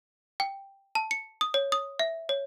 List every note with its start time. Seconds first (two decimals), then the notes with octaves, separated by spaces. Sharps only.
0.40 G5
0.95 A5
1.11 C#7
1.41 D#6
1.54 C#5
1.72 D#6
1.99 E5
2.29 C#5